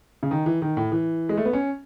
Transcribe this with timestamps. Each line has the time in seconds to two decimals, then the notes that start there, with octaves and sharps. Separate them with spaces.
0.23 C#3
0.31 D#3
0.46 E3
0.62 D#3
0.77 A2
0.92 E3
1.29 G#3
1.37 A3
1.45 B3
1.53 C#4